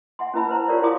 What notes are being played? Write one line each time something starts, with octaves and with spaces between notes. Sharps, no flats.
E5 F#5 G#5 C6
C#4 E4 B4 E5 A5 B5
B4 C5 A#5
F4 G4 A#4 C#5 D5 E5
E4 F5 G5 C6 D6 D#6